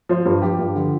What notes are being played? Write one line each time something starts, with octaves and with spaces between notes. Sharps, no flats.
F3 C5
G2 C5
F3 G4
G2
D3 F3